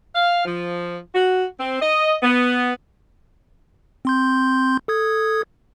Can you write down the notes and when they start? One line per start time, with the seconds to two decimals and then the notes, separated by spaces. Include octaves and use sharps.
0.15 F5
0.45 F3
1.15 F#4
1.58 C4
1.82 D#5
2.22 B3
4.05 C4 C6 G6
4.88 A4 D#6 G#6